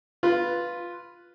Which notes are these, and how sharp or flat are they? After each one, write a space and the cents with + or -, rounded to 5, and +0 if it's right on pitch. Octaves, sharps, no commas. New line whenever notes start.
F4 +0 B4 +0